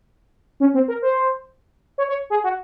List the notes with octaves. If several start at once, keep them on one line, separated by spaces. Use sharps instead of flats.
C#4
C4
A#4
C5
C#5
C#5
G#4
F#4